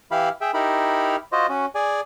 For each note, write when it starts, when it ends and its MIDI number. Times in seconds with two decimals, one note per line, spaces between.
0.11 0.29 52
0.11 0.29 64
0.11 0.29 67
0.11 0.29 77
0.11 0.29 83
0.41 0.51 68
0.41 0.51 76
0.41 0.51 79
0.54 1.16 63
0.54 1.16 64
0.54 1.16 67
0.54 1.16 70
0.54 1.16 83
1.32 1.46 65
1.32 1.46 66
1.32 1.46 72
1.32 1.46 75
1.49 1.66 61
1.49 1.66 66
1.75 2.01 68
1.75 2.01 74
1.75 2.01 80